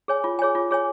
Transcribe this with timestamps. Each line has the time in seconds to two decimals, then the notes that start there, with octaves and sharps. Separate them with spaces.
0.08 G#4 C#5 G#5
0.24 F4
0.39 G#4 C#5 G#5
0.55 F4
0.71 G#4 C#5 G#5